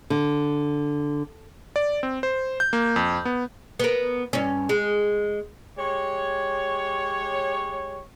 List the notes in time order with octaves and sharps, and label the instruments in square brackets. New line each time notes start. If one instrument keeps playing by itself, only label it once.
[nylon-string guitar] D3
[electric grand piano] D5
C4
C5
G6
A#3
F2
B3
[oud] B3 A#4
G2 C#4
G#3
[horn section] G#3 G4 C#5